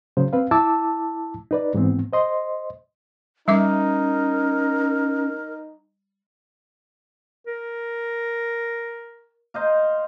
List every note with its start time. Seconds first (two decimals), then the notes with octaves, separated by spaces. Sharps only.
0.17 C#3 F#3 C5
0.33 C4 B4 F5
0.51 E4 A5 D6 E6
1.51 D#4 B4 D5
1.74 G#2 E3 B3 C4
2.13 C5 D#5 C6
3.48 G3 C#4 D#4 A#4 E5 D6
7.47 A#4
9.54 C5 D#5 F5